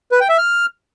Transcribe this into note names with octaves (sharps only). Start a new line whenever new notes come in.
B4
G5
E5
F6